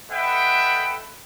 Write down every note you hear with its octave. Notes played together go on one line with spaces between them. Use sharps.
A4 B4 D#5 E5 F#5 G5